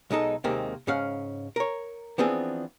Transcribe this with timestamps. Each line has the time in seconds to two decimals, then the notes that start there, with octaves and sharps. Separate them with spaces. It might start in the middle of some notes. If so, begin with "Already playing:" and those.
0.11 B1 G#3 D#4 A4
0.44 D#2 C3 D#3 G#3 A#3 C4
0.87 G#2 C#3 C#4 F5 F#5
1.56 A#4 C#5
2.18 E3 F3 B3 C4 D4 G#4